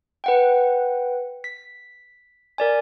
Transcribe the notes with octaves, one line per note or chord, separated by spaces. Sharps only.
B4 F#5 G5
B6
A#4 D5 G#5